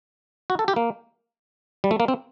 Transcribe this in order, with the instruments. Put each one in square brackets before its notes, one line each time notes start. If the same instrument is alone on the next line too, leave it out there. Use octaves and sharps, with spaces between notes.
[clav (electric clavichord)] F#4
A4
G4
A#3
G3
A3
A#3
C4